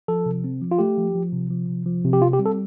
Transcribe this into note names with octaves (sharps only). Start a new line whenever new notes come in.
F3 A4
C3
C4
F3
F4
A3 G4
F3
F3
C3
F3
C3
F3
C3
G4
C4 F4
G4
G3
A4